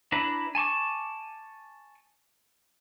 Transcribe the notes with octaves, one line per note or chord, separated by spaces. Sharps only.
D4 E4 B4 A#5
G#5 A5 C#6 D6